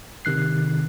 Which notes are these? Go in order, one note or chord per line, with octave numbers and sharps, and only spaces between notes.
C3 D#3 F#6 C7